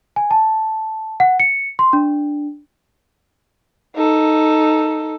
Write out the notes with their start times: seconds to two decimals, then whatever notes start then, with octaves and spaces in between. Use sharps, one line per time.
0.16 G#5
0.31 A5
1.20 F#5
1.40 C#7
1.79 C6
1.93 D4
3.96 D#4 A4